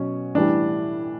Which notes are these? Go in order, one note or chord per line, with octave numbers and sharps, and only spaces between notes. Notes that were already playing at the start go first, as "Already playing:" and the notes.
Already playing: B2 F#3 C#4
A2 E3 G3 D4